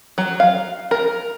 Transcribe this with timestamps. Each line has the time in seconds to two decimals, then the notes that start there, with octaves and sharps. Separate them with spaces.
0.18 F#3
0.40 F5
0.91 A#4